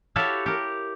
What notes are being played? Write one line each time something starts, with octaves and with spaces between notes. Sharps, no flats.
E4 F#4 G4 A4 C#5 F5
G4 A#4